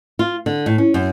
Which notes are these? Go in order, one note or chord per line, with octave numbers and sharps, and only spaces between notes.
F4
D3
A2
C#4
F#2